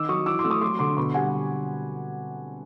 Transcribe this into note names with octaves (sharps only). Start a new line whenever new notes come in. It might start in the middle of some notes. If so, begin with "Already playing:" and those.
Already playing: D#3 D6 E6
F#3 C#6 D#6
E3 D6 E6
C6 D6
A3 E6
C#6 D#6
F#3 C6 D6
D3 C6 D6
B2 B5 C#6
G3 F#5 G#5